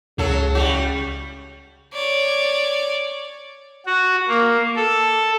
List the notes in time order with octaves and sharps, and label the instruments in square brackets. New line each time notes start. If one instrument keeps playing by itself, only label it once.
[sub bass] C#2 [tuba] C#3 [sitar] F#3 A4
[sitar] G3 F#4
[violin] C#5 D5
[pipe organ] F#4
A#3
A4